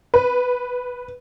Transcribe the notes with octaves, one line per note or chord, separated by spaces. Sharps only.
B4